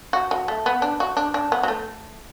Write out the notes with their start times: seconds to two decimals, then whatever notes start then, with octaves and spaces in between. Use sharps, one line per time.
0.13 F#4
0.31 F#3
0.48 A3
0.66 B3
0.82 D4
1.00 F#4
1.17 D4
1.34 D4
1.52 B3
1.63 F#3
1.68 A3